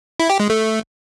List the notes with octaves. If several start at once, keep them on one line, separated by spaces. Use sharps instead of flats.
E4
G4
G#3
A3